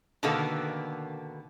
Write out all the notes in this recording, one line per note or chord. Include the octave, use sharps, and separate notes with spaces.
B2 D3 D#3 A#3 B3 A4